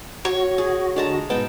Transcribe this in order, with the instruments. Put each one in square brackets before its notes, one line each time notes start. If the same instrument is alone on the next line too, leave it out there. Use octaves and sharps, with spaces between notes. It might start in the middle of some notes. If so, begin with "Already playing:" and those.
[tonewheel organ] F#4 [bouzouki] C#5
[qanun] G#4
[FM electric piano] D3 [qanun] G#3 A5 A#5
[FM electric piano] G#2 B2 B3 [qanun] D#4 G5 A5